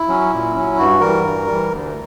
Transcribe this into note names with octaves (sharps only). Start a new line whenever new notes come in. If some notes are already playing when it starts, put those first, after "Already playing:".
Already playing: E4
F#3 C#4
A#2
F#3 C#4
G2 F#4
E3 G3 A#4
G2
E3 G3
D2